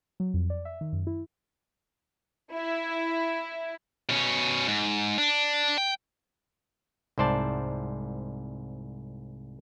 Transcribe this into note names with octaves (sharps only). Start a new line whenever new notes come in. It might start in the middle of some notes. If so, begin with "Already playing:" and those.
F#3
F2
D5
E5
D#3
F#2
E4
E4
B2 C#4
G#2
D4
G5
C2 G#2 C5 D5 A5